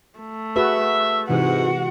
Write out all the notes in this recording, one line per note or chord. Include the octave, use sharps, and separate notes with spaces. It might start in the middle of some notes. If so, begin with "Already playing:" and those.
A3
F#4 G#4 B4 E5
G#2 C3 E3 G#3 F#4 F#5